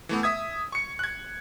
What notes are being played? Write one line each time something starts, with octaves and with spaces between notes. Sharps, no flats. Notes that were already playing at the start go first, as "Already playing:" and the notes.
E3 A3 B3
E5 D#6 G#6
C#6 C#7
F#6 G#6